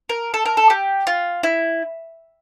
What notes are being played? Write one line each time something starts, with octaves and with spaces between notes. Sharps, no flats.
A#4
A4
A#4
A4
G4
F4
E4